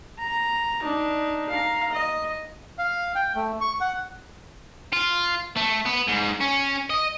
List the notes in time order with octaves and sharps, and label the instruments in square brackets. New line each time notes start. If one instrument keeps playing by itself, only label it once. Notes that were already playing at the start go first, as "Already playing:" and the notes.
[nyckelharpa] A#5
D4 D#4
F5 A#5
D#5
[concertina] F5
G5
A3
C#6
F#5
[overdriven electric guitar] F4
A3
B3
G#2
C#4
D#5